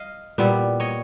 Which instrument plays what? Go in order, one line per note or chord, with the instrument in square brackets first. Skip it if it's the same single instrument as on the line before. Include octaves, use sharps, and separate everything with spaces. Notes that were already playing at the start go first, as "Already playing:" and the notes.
Already playing: [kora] D#5 F5
A#2 G3 B3 E4
C#5 D#5